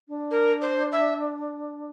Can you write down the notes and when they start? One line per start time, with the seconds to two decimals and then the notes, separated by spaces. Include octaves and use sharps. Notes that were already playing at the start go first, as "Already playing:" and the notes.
0.08 D4
0.31 A#4
0.62 C5
0.92 E5